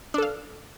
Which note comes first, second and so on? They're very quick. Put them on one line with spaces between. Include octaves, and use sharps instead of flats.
D4 A4 F5